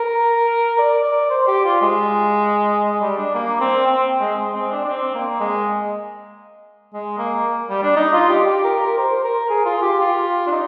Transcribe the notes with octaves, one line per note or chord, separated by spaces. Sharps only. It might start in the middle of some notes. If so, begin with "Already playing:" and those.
Already playing: A#4
D5
D5
C5
G4
F4
G#3
G#3
G3
D4
A#3
C4
C4
G#3
G#3
C4
D4
D4
C4
A#3
G#3
G#3
A#3
G3
D4
D#4
F4
G4
G4
A#4
A#4
C5
A#4
G#4
F4
G4
F4
D4
D#4